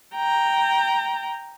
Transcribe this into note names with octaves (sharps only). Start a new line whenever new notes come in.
G5 A#5